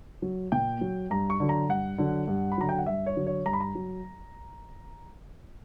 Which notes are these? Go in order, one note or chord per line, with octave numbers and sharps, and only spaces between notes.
F#3
A#2 G5
F#3
G2 A#5
C#6
D3 F#3
A#5
G2 F#5
D3 F#3
G2
B5
D3 F#3 A#5
G5
F#5
G2 E5
C#5
D3 F#3
C#5
G2 A#5
B5
A#5
F#3